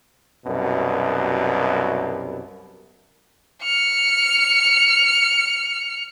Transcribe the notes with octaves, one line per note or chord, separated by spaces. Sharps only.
C2 F#2 B2
F6 C#7